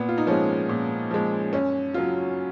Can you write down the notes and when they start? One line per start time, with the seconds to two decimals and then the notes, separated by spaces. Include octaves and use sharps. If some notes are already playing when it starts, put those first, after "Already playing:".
Already playing: A#2 B3
0.09 F4
0.18 D#4
0.27 F3 G#3 C#4
0.69 A#2
1.11 F3 G#3
1.52 F#2 C#4
1.94 C#3 F#3 F4